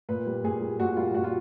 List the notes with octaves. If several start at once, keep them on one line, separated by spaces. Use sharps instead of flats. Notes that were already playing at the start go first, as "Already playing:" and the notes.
A#2 B4
G3
A#2 G#4
G3
A#2 F#4
G3 F4
A#2 F#4
F4